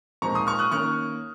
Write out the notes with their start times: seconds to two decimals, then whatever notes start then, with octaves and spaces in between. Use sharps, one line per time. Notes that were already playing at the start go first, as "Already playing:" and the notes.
0.22 A#2 F3 G#3 C4 D#4 A#5 C#6
0.35 C6 D#6
0.47 C#6 F6
0.59 D#6 F#6
0.71 D#3 A#3 C#4 C#6 F6